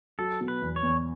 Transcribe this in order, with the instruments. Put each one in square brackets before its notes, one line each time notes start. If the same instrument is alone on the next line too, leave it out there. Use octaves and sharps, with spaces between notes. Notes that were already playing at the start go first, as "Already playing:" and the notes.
[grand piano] F#3 [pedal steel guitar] A4
[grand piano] B2
[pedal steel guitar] B4
[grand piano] E2
[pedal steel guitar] C#5
[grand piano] E2